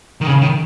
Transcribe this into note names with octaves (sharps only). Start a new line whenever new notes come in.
D#3
C#3
D#3